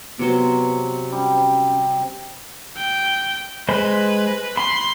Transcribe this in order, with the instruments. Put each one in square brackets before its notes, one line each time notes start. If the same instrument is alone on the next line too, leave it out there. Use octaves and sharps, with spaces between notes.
[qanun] C3 F#3 C5 [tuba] B3
[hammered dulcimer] G3 [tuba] C#4
[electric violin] G5
[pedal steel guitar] G#3 C5 B5 [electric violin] B4
[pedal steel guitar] B5 [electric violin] C6